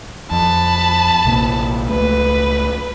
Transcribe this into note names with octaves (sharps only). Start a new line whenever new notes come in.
F2 A5 B5
A#1 C3 A#3
C#2 A3 B4